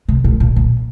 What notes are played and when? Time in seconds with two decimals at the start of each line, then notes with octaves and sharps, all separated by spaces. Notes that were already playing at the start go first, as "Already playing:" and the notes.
0.09 C3
0.24 A2
0.40 A#2
0.56 A#2